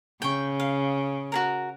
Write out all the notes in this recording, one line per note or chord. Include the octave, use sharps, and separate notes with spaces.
C#3 G5 C#6
F5
F#4 G#4 A#4